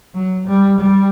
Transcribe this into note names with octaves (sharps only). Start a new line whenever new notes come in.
F#3
G3
G3